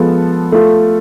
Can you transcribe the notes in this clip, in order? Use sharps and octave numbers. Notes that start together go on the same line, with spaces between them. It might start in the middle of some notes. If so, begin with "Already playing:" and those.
Already playing: F3 G#3 B3 F4 A4
A3 F4 A4